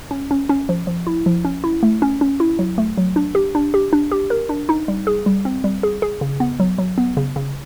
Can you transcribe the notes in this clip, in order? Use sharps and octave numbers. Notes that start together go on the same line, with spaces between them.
C#4
C#4
C#4
F3
F3
E4
F3
C#4
E4
A3
C#4
C#4
E4
F#3
A3
F#3
D4
G4
D4
G4
D4
G4
A#4
D4
D#4
G3
G#4
G3
C4
G3
G#4
G#4
C#3
B3
F#3
F#3
B3
C#3
C#3